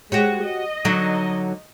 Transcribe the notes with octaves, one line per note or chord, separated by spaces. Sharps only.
G#3 F#4 G4 C#5
D#5
D3 F#3 D#4